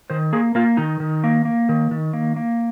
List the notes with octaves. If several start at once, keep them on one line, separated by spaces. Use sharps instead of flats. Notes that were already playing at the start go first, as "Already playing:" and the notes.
D#3 C5
A#3 G#4
A#3 F4
D#3 D#4
D#3
A#3
A#3
D#3
D#3
A#3
A#3